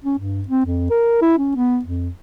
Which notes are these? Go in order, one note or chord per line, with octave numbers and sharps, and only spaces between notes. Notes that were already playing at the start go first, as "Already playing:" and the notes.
C#4
G2
C4
F2
A#4
E4
C#4
B3
F2